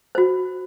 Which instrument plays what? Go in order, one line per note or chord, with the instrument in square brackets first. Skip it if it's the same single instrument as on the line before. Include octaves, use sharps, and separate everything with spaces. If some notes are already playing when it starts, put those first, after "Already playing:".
[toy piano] F#4 C5